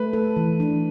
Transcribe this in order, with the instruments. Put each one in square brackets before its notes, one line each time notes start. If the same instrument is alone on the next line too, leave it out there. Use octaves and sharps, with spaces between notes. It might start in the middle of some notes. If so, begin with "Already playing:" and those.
Already playing: [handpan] A3 [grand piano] B4
[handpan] A4
E3
D4